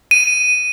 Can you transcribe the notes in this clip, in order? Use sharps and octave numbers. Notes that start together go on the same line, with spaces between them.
D#7